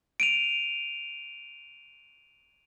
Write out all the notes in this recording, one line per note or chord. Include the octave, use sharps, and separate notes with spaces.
D7 D#7 F7